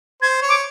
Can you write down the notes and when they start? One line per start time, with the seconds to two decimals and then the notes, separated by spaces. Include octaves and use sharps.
0.22 C5 G#6
0.42 C#5
0.49 D6